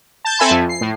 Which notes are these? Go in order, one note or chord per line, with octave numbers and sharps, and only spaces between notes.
A5 G6
C4 A4 E5 G#5 A5 B5
F2
C7
A2